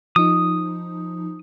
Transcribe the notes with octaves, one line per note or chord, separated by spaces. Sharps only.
F3 D#4 D#6